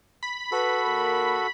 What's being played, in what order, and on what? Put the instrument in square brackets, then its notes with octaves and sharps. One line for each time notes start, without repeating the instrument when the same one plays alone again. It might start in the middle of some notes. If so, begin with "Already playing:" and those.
[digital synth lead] B5
[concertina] F#4 A4 [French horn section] B4 [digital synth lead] B5
[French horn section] D#2 A#3 A#4